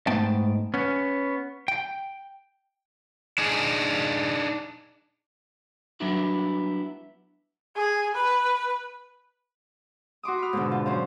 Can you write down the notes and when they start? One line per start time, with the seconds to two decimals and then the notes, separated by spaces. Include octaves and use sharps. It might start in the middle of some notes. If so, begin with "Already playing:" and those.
0.07 G#2 A3 B3 G5 A5
0.74 B3 C#4
1.68 G5
3.38 D4 D#4 G#4
6.00 F#3 G3 B3 D4 E4 F#4
7.76 G#4
8.15 B4
10.23 F#4 C6 D6 D#6
10.38 B5 F6
10.53 G#2 B2 D3
10.72 F4
10.86 F#2 C#4 C5 F5